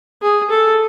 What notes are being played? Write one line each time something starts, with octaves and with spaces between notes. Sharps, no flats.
G#4
A4